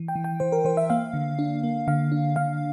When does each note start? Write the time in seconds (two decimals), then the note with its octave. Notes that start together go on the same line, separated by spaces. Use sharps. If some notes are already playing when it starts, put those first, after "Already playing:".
Already playing: E3
0.08 G5
0.16 E3
0.24 G5
0.40 E3 C5
0.52 A#4
0.65 E3 C5
0.77 E5
0.90 A#3 F5
1.13 D3
1.39 D4
1.63 A#3
1.87 D3 F5
2.12 D4
2.36 D3 F5